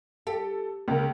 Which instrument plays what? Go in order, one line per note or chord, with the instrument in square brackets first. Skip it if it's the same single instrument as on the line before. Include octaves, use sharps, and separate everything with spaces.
[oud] G4 [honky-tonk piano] A4
[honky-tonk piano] C#2 A#4 [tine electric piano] C#3 A#3